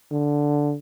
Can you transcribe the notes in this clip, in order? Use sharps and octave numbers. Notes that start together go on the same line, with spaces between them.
D3